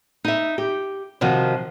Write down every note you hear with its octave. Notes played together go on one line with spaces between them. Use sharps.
D#4 E5
G4
C3 D#3 F3 F#4